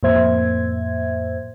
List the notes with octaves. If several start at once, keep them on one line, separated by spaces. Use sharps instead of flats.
F2 A2 A#3 C5 E5 G#6